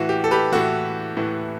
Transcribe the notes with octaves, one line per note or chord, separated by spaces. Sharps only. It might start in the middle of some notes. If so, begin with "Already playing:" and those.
Already playing: A2 E3 F#4
G4
A4
G4 B4
A2 E3 F#4 A4
A2 E3